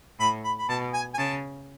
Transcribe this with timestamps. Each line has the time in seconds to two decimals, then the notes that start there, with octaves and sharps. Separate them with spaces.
0.19 A2 B5
0.44 B5
0.58 B5
0.69 B2 A5
0.93 G#5
1.14 G#5
1.18 C#3 A5